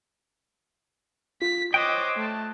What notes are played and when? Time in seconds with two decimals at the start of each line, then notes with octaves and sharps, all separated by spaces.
1.42 F4 B6
1.74 C5 C#5 D#5 G5 D6 F#6
2.17 A3 A5